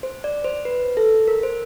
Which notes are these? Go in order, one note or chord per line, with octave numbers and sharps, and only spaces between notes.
C5
D5
C5
B4
A4
A#4
C5